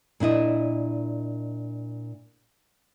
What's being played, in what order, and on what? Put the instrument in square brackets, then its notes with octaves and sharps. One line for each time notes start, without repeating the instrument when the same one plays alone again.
[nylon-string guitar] A#2 D4 E4 D#5